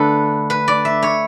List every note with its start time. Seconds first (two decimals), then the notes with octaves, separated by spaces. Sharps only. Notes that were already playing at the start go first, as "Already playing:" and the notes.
Already playing: D3 A3 D4 A4 B4
0.50 B4
0.68 D5
0.85 E5
1.02 C#5